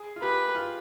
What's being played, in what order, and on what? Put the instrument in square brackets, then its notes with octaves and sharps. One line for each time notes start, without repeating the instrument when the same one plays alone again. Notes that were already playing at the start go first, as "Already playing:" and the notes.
Already playing: [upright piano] G#4
F4
[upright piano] G4 [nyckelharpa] B4
[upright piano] F4